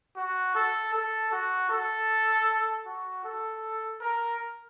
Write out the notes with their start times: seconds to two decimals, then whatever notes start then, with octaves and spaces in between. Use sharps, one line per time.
0.16 F#4
0.55 A4
0.94 A4
1.32 F#4
1.70 A4
2.86 F#4
3.25 A4
4.01 A#4